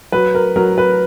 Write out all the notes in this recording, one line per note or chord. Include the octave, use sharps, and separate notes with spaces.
F#3 B4
A#4
F#3 A#4
B4